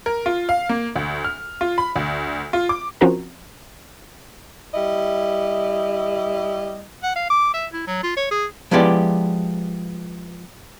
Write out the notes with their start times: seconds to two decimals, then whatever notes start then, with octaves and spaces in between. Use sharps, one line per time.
0.06 A#4
0.26 F4
0.49 F5
0.69 A#3
0.96 D2
1.25 F6
1.61 F4
1.78 B5
1.96 D2
2.53 F4
2.69 D6
3.01 F3 C4 C#4 F#4 A#4 A#5
4.74 G3 E4 D#5
7.03 F#5
7.16 F5
7.30 D6
7.54 E5
7.73 E4
7.87 F#3
8.03 F4
8.17 C#5
8.31 G#4
8.71 F3 G#3 B3 E4 G4 D5